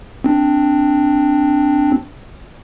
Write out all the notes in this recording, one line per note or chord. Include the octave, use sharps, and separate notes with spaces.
C4 D4